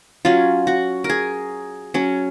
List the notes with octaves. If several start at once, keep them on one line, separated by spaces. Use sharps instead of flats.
F#3 C#4 F4
F#4
A#4
G#4
F#3 C#4